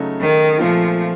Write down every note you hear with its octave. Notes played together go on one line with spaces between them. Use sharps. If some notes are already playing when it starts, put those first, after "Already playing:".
Already playing: C#3 F#3 A3 D#4
D#3
A#2 F3 A3 C4 F4